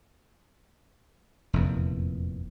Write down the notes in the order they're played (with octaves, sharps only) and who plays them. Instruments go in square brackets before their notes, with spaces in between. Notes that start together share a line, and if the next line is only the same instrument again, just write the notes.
[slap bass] F1 E2 A#2